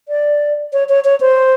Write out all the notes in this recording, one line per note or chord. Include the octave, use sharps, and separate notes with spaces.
D5
C#5
C#5
C#5
C5